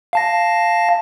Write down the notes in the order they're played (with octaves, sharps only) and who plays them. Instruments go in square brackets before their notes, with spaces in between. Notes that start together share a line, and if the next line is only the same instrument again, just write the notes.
[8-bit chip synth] F5 A5 A#6